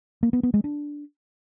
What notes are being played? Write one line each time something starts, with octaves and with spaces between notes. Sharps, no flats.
A#3
B3
B3
G#3
D4